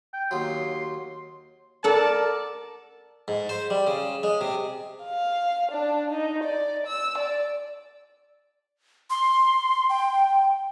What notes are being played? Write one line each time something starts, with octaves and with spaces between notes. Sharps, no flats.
G5
D#2 F#3 C6
A4 A#4 D5 F#5 A5
G#2
C5
G3
C#3
G#3
C3
F5
D4
D#4
D5
E6
D5
C6
G5